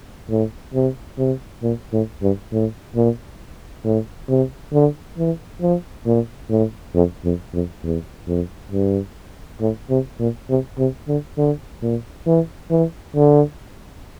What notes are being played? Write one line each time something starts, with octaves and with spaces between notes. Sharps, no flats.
A2
C3
C3
A#2
A2
G2
A2
A#2
A2
C3
D3
E3
F3
A#2
A2
F2
F2
F2
E2
F2
G2
A2
C3
A#2
C3
C3
D3
D3
A#2
E3
E3
D3